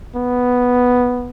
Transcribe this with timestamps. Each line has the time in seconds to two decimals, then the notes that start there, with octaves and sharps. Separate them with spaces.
0.15 B3